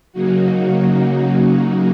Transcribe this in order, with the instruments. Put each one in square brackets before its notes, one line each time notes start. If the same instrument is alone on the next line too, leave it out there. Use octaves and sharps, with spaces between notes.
[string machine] C#3 F#3 A#3 D#4 F#4